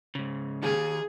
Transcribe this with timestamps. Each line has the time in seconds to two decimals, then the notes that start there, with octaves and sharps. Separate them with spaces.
0.15 G#2 C#3
0.63 D#3 D#4 G#4 F5